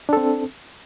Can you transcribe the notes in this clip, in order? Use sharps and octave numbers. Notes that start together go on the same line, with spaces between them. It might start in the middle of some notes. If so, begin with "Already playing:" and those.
C4 D4 A4